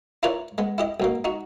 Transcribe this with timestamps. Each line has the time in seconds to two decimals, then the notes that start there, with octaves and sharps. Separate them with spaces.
0.23 E4 F4 A#4 B4 C#5 D5
0.58 G#3 B3
0.78 E4 G4 D#5
1.00 B1 B2 A#3
1.24 D#4 F#4